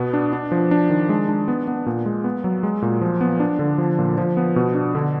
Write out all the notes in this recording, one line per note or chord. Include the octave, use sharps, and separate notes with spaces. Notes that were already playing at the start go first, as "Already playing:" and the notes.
Already playing: B2 B3
D4
D4
F3
D4
D#3
G#3
D4
B3
B3
A#2
G#3
B3
F#3
G#3
A#2
F3
B3
D4
D3
F3
A#2
F3
B3
B2
D4
D3